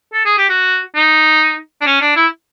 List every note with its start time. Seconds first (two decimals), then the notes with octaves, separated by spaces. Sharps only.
0.14 A4
0.26 G#4
0.38 G4
0.50 F#4
0.96 D#4
1.81 D4
1.86 C#4
2.01 D4
2.16 E4